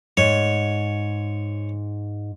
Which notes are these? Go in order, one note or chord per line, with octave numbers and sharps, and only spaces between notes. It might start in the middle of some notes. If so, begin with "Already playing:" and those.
G#2 C#5